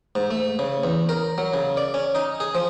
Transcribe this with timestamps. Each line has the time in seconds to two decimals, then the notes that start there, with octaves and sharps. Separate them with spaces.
0.15 G#2
0.31 A3
0.59 C#3
0.84 E2
1.09 A#4
1.38 F#3
1.54 C#3
1.77 D5
1.94 C#4
2.15 D#4
2.40 G#4
2.55 F3